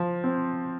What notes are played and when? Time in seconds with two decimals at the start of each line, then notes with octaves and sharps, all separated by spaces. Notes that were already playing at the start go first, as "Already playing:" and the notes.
Already playing: F3
0.24 C4